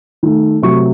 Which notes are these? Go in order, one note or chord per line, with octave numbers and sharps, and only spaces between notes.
D#3 A3
C3 F#3 A3 C#6